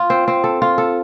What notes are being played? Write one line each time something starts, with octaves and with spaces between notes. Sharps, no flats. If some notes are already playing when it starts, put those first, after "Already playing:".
Already playing: F4
C4
C4
A4
F4
A4